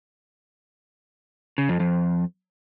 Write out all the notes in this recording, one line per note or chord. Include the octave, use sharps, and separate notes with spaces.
C#3
F2
F2